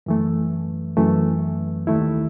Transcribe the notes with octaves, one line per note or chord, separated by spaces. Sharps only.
F#2 E3 A3
F#2 E3 A3
D#2 D#3 A3 E4